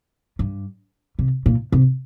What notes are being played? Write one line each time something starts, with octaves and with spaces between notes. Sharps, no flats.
G2
C3
A#2
C3